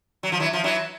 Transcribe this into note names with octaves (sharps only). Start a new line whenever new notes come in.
F#3
F3
E3 F#3
F3
E3 F#3